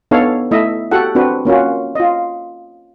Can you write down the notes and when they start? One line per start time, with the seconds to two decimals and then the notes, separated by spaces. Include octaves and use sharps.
0.11 B3 D4 D#4 A4 C#5 F5
0.51 A3 E4 D#5 E5
0.92 F#4 G4 A4 F#5
1.15 C4 D4 F#4 B4
1.45 A#3 C#4 F4 F#4
1.95 F4 D#5